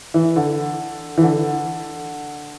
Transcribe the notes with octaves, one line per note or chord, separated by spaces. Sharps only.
E3
D3
E3
D3